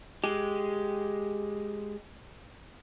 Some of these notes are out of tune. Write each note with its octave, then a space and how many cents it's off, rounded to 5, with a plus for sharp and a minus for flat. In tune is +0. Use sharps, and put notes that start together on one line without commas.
G#3 +0 G4 +0